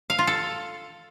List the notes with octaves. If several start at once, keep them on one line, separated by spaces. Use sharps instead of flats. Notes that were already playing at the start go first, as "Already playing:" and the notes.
F5
F4
A4